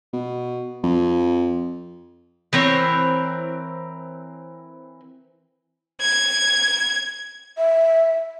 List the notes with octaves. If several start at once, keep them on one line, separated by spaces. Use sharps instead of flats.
B2
F2
E3 C4 A#4 C#5
G#6
E5